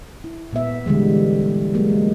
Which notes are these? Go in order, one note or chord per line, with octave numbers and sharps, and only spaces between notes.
E4
A#2 B3 E5
D3 E3 G3 G#3
F#3 G#3 A#3